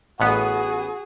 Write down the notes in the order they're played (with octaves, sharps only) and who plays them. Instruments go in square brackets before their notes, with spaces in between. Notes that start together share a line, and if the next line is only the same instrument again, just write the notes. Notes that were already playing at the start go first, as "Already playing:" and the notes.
[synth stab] A1 B3 D#7 [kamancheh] F#4 G#4